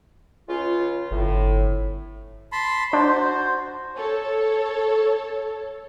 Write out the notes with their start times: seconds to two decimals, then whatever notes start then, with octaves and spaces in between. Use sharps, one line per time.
0.49 C#2 C#3 F4
1.11 G1 A2
2.52 A5 B5 C6
2.93 D4 F#4 C5
3.96 A4 C#5